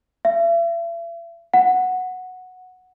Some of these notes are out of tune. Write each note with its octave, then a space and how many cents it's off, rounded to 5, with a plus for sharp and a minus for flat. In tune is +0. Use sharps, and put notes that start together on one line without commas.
E5 +40
F#5 -5